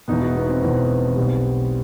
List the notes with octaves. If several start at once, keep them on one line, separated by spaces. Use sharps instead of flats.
E1 E2 B2 B3 D#4
D#4 F#4
B3 D#4
C4
E1 E2 B2 C4
B1 B2 G3